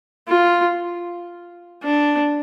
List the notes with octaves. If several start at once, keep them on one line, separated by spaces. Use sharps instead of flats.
F4
D4